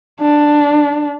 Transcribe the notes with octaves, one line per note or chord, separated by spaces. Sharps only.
D4